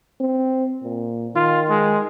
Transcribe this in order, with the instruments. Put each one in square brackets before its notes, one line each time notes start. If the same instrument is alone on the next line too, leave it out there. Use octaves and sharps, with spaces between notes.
[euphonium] C4
A#2
[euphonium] D#3 [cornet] F4
[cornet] G#3